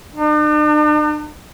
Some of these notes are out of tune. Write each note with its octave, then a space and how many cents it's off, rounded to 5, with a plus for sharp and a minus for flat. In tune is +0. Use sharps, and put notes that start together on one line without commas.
D4 +45